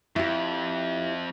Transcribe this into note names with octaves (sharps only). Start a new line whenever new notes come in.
F2 E4 G4